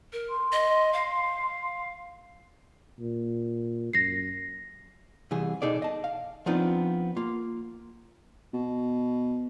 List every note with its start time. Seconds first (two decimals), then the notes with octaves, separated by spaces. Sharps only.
0.13 A#4
0.29 C6
0.52 D#5
0.93 F5
3.00 A#2
3.93 F#2 A#6 C7
5.31 C2 E3 G#4
5.62 B2 D#4 G#4 A4 D5
5.82 D#5 A5
6.04 F5
6.46 F3 B3 C4 D4 D#4 F4
7.17 A#3 F4
8.53 B2